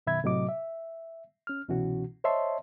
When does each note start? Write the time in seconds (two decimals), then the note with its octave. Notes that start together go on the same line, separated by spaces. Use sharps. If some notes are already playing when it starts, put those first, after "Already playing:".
0.07 F#2 B2 D#3 E5 B5 G#6
0.24 A2 C3 F#3 D#5 D6
0.49 E5
1.47 C#4 F6
1.68 C2 B2 E3 C#4 F#4
2.24 C5 C#5 D#5 E5 A5 C6